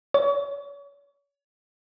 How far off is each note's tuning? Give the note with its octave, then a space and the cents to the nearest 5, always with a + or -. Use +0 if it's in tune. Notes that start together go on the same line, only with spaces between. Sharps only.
C#5 +35